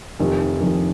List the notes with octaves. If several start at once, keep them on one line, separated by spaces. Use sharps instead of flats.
F1 F2 D#3
F1 F2 D#3